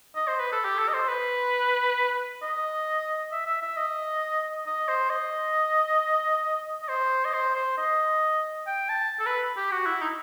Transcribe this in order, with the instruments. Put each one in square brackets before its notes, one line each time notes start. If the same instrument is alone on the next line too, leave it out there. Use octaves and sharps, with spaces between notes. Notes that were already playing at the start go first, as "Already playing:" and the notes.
[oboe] D#5
C5
B4
A4
G4
A4
D#5
C5
B4
D#5
E5
E5
E5
D#5
D#5
C5
D#5
D#5
C5
D#5
C5
C5
D#5
G5
A5
A4
B4
G4
F#4
E4
D#4